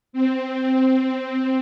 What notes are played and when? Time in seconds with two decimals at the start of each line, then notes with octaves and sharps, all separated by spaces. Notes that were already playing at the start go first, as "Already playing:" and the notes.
0.13 C4
0.57 C4